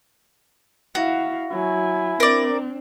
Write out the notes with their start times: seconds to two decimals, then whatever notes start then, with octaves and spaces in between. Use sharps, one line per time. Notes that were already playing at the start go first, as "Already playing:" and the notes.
0.95 E4 F#4 F5
1.51 F#3 E4 G#5
2.20 C4 D4 A#4 D5